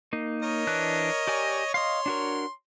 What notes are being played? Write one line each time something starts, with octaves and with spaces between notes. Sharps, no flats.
A#3 D#4
A#4 C#5 D#5
E3 D4 F#6
G4 D5 G#5
C#5 D#5 F5 C6
D4 F#4 A#4